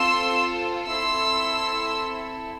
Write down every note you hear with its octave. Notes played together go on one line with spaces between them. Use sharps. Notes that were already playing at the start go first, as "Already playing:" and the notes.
Already playing: C4 F4 A4 C6 E6
C4 E4 A4 C6 E6